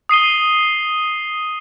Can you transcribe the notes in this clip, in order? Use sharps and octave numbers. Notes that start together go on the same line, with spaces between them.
D#6 C7 D#7 G7